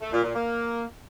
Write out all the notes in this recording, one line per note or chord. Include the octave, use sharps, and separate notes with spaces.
A3
A#2
A#2
A#3